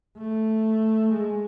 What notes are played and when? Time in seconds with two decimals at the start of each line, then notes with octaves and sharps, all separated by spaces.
0.18 A3
1.13 G#3